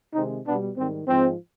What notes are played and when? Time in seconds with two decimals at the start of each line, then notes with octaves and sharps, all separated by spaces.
0.14 C3 D#3 G#3 C4 D#4
0.46 B2 G3 B3 D4
0.76 G#2 D#3 G3 C4
1.08 G#2 F3 G#3 C4